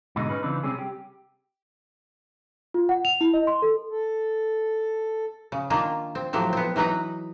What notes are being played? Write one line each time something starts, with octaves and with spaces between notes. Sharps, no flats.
G#2 B2 D3 G#3 D#4
C#4 D#4 G#4 B4
C#3 E3 C4 D4 D#4 B4
C3 G3 C4 C#4 G#4
G4
F4
F#5
F7
E4
D#5
C6
A4
A4
C#3
D#3 A#3 D4 F4
C4
A2 F3 F#3 G4
B3 C4
E3 F#3 D#4 B4 A#5